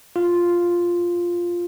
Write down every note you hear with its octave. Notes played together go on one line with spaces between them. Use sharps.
F4